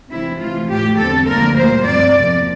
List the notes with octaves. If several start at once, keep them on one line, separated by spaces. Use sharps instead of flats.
C3 E3 A3 C4 E4
C3 E3 A3 F4
A2 E3 A3 G4
E2 D3 G3 C4 A4
D2 D3 F3 A#3 A#4
A#2 G3 A#3 C5
G2 F3 C4 D5
E2 C3 F3 A#3